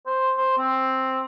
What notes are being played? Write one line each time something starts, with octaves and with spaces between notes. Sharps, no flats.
C5
C5
C4